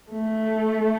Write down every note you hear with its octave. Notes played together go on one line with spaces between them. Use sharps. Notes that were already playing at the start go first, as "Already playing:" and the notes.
A3